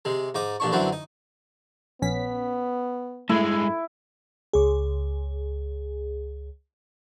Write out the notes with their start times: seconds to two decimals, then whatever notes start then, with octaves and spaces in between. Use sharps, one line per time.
0.05 C3 G#3
0.35 G#2 D#4 D6
0.60 A1 A#2 D4 C#6
0.72 F#2 D3 E3 F#3 C4
0.92 D#4
2.02 A#1 B3 C#4 B6
3.29 G2 G#3 A3 E4
4.53 C#2 G#4